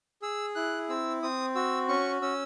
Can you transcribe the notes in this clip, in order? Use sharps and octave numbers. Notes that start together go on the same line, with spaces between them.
G#4 E6
E4 F#6
C4 E6
C4 D#6
F#4 E6
C#4 C#6
C#4 E6